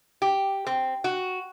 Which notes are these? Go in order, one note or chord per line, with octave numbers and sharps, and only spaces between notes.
G4
C4
F#4